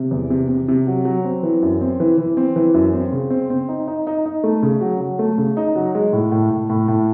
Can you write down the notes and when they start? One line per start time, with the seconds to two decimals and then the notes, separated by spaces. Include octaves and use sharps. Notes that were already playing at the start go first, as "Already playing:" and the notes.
Already playing: C3
0.11 E2
0.30 C3
0.49 C3
0.68 C3
0.87 F#3
1.05 F#3
1.24 C4
1.43 E3
1.62 F#2
1.81 C4
2.00 E3
2.18 E3
2.37 C4
2.56 E3
2.74 F#2
2.93 C4
3.12 C#3
3.30 C4
3.50 C4
3.69 D#4
3.88 D#4
4.07 D#4
4.26 D#4
4.44 A3
4.63 C#3
4.81 F#3
5.01 F#3
5.19 A3
5.38 C#3
5.57 D#4
5.76 F#3
5.95 G#3
6.13 A2
6.32 A2
6.50 A2
6.69 A2
6.88 A2